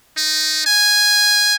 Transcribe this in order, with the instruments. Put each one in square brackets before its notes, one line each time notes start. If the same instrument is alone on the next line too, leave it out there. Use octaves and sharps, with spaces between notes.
[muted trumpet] D#4
G#5